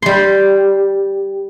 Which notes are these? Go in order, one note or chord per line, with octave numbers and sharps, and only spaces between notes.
G3 C6